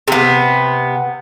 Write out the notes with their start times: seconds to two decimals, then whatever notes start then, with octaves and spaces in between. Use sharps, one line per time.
0.08 C3 B3